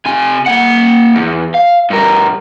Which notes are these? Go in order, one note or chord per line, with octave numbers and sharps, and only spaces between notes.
C3 G#5
A#3 F#5
E2
F5
G2 A#4